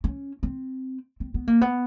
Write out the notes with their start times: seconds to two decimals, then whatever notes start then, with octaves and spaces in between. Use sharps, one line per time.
0.04 C#4
0.43 C4
1.20 C4
1.34 B3
1.48 A#3
1.61 B3